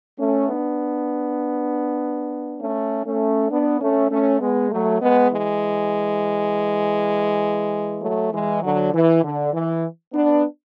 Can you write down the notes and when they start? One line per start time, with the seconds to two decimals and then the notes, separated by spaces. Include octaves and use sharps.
0.18 A3 C#4
0.49 B3 D4
2.60 A3 C#4
3.05 A3 C#4
3.51 B3 D4
3.80 A3 C#4
4.10 A3 C#4
4.40 G#3 B3
4.71 F#3 A3
5.01 G#3 B3
5.31 E3 G#3
8.02 F#3 A3
8.33 E3 G#3
8.62 D3 F#3
8.94 E3
9.23 D3
9.54 E3
10.13 B3 D4